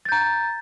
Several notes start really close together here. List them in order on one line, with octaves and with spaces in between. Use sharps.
A6 G6 A#5